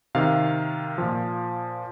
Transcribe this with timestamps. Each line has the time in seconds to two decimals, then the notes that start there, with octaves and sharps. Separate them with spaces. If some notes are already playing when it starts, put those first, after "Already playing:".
0.15 C3 D#3 F5
0.98 A#2 F3